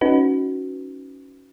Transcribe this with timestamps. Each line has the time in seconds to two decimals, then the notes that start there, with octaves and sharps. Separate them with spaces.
0.01 C#4 D#4 F#4 B4